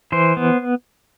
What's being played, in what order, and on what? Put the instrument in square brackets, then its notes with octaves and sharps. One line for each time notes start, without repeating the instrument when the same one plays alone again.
[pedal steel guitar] E3 C5
B3